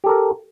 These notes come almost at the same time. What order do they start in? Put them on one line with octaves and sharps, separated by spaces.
G4 A4 A#4